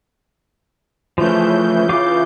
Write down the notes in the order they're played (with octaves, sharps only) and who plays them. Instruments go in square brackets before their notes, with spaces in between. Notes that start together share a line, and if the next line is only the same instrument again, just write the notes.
[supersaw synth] C#3 E3 G6 [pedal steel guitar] F3 A3
[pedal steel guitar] F4 F5 D6